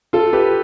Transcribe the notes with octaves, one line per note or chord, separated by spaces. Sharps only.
F4 A4
G4 B4